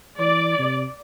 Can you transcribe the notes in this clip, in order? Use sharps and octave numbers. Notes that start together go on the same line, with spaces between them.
E3 D5
C3